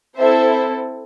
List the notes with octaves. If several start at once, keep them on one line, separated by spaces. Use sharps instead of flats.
C4 E4 A4 C5 E5